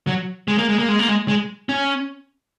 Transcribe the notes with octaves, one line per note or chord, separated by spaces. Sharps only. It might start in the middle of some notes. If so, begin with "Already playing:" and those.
F#3
G#3
A#3
G#3
A#3
G#3
A#3
G#3
G#3
C#4